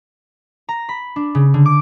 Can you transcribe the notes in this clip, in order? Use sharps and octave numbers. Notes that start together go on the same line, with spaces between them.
A#5
B5
D4
C#3
D3
D6